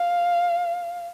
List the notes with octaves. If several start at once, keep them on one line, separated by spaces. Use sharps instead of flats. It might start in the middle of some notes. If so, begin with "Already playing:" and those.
Already playing: F5